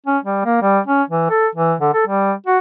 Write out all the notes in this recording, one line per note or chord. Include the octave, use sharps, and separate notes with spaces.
C#4
G3
A#3
G3
C#4
E3
A4
E3
D3
A4
G3
F#4